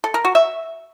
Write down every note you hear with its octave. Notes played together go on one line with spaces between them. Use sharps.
A4
A#4
F#4
E5